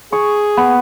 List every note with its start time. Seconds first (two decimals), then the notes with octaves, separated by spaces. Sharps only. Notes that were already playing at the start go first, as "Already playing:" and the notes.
0.13 G#4 C#6
0.57 B3